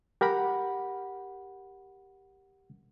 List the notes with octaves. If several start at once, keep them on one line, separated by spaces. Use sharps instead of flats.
G4 A#4 F#5 B5